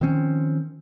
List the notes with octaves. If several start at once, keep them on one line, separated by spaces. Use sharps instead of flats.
D#3 F3 C4 C#4